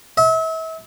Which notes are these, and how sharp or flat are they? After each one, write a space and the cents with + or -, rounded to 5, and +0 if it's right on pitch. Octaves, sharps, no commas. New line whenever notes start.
E5 -35